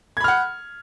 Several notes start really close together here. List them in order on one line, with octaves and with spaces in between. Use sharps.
G#6 B5 F6 F#5